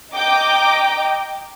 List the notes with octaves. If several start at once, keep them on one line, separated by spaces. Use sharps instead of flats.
D#5 G5 A#5 D6